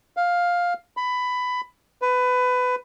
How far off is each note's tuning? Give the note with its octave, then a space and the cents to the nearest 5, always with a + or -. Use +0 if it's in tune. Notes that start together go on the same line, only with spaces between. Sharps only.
F5 +10
B5 +15
B4 +20